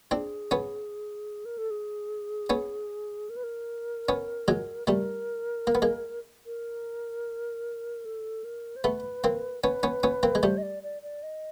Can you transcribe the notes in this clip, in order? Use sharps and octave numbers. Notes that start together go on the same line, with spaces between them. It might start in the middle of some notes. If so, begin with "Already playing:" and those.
C4 D4 G#4
B3 C#4
A#4
A4
G#4
B3 C#4
A#4
B4
A#4
B3 C#4
F#3 G#3
G3 A3 A#4
A#3
B3
G#3 A#3
A#4
A4
A#4
C5
A3 B3 B4
A#3 C4
B3 C#4 B4
B3 C#4
B3 C#4
A#3 C4
G#3
G3 A3 C5
D#5
D5
D5
D5
D#5